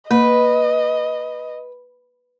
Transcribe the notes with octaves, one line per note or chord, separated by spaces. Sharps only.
A#3 B4 D#5